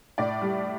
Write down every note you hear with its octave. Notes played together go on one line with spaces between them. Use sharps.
A2 D5
G3